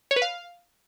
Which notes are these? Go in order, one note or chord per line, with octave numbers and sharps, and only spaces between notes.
C#5
B4
F5